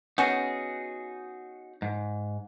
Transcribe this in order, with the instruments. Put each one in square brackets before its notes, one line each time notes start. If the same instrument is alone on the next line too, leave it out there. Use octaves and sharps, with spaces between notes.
[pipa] B3 C#4 [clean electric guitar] D#4 F#4 G#4
[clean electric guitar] G#2